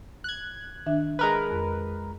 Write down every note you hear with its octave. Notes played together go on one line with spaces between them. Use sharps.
F#6 G#6
D#3 D4 E5
G#3 A#4 B4
F2